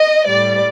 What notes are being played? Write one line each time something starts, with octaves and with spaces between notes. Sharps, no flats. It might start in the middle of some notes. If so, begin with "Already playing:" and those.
Already playing: D#5
A2 G3 D5